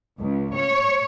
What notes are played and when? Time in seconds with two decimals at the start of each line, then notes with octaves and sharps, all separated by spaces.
0.19 C#2
0.56 C#5